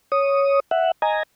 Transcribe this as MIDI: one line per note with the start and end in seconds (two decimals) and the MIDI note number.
0.12 0.60 73
0.12 0.60 87
0.71 0.91 76
0.71 0.91 78
1.02 1.23 75
1.02 1.23 80
1.02 1.23 82